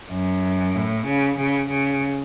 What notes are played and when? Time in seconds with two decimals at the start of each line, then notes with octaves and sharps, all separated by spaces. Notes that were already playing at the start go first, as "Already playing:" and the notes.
0.11 F#2
0.75 A2
1.06 C#3
1.38 C#3
1.70 C#3